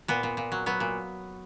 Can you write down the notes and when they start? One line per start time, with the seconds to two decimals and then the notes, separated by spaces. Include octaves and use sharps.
0.08 A#2 B3
0.23 A#2
0.37 A#2
0.52 F#3
0.66 F#3 B3
0.80 A#2